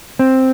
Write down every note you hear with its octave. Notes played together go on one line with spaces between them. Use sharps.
C4